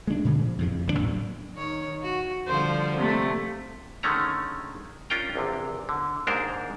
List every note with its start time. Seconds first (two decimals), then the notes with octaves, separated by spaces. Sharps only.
0.07 G#3 A3 C#4 D4
0.25 A#2 D3 G#3 A3
0.42 F3
0.59 F2 A2 C#3
0.87 G1 E2 C#3 D4
0.99 A2 F#3
1.53 D#3 C#5
2.03 F#4
2.47 D3 F3 G3 C5
2.96 C3 A3
4.03 D3 D#3 G#3 A3 C#4 A#5
5.10 C#4 D4 F4 A#4 G5 A#5
5.35 A#1 E2 C3
5.89 D3
6.27 D#2 G#2 G#3 D4 A#4 C5